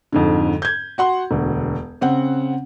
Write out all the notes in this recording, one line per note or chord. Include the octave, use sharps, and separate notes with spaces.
F2 G#2 D3
G6 G#6
F#4 F#5 C6
E1 D2
C#3 C4 F#5